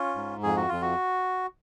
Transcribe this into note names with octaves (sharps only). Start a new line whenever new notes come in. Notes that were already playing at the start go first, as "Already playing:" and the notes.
Already playing: C#4 F4
G#2
F2 G#4
F#4
F2 F4
F#4